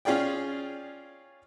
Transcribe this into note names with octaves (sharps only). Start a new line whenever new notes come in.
C#4 F4 G#4 D5 G5